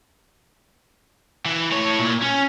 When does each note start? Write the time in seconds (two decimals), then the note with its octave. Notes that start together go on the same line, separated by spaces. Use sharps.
1.45 E3
1.71 A2 C#5
2.00 A#2
2.22 C#4